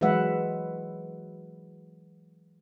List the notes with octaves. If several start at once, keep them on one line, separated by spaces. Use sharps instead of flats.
E3 F#3 G#3 B4 E5 F#5